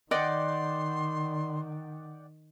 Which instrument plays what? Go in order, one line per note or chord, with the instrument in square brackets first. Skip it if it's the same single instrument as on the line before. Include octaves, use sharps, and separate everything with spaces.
[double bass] D#3 [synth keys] D5 F#5 G5 [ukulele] D#5 [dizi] C6